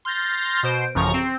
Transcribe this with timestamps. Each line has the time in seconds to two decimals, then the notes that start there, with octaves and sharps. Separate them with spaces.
0.05 C6 F6 G6 A6 A#6
0.63 B2 C5 D7
0.95 A1 F#2 C#3 F3 A#5 C#6
1.14 C4